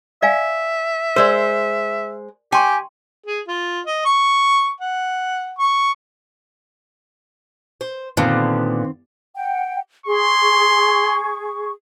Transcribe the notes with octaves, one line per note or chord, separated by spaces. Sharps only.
D5 E5 F5 G#5
G#3 A#4 C5 D5
G4 G5 G#5 C6 C#6
G#4
F4
D#5
C#6
F#5
C#6
C5
A#2 D3 D#3 B3 C4
F#5 G5
G#4 C6 C#6